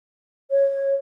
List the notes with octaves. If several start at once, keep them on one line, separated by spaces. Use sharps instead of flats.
C#5